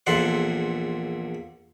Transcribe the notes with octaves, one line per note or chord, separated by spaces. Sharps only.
A#1 E2 A#2 A4 F#5 C6